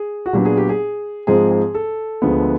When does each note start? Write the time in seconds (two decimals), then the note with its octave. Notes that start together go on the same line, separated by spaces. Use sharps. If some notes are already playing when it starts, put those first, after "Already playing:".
Already playing: G#4
0.26 F#4
0.33 A#2 F#3 B3 D4 G4
0.45 G#4
0.57 G4
0.69 G#4
1.27 G#2 F3 G#3 C4 G#4
1.51 G#4
1.75 A4
2.22 D2 D3 F3 G#3 B3